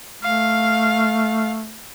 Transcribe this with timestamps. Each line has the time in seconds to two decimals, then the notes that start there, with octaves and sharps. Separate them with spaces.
0.23 A3 F5